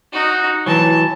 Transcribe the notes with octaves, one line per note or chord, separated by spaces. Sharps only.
D#4 F#4
E3 F#3 A5